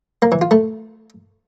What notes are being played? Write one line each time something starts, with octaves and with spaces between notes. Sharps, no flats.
A#3
E3
F4
A3